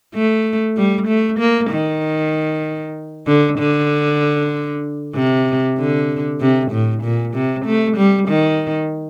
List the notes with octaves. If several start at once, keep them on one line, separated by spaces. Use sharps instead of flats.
A3
G3
A3
A#3
D#3
D3
D3
C3
D3
C3
A2
A#2
C3
A3
G3
D#3